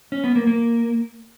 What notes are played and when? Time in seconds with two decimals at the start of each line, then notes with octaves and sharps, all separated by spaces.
0.12 C#4
0.24 B3
0.36 A#3
0.47 A#3